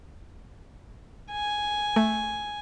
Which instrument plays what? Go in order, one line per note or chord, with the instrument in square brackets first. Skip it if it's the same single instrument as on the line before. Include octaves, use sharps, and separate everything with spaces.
[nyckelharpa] G#5
[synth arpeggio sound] A3